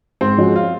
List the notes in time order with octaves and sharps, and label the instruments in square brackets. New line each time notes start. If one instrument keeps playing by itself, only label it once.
[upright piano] G#2 [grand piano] C4
[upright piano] F3 G#3 C#4 F#4
[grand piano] F4